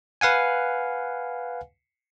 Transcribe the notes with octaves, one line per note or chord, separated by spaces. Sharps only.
B4 F5 F#5 G#5